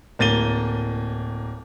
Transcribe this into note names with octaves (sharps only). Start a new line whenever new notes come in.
D1 A#3 A6 D#7 G7